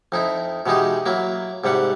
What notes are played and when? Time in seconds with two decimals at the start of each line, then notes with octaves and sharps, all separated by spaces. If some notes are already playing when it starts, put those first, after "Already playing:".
0.12 F2 D#4 E4
0.66 B2 E3 G#3 D#4 G4
1.06 F#3 A#3 E4
1.64 G#2 C3 G3 F#5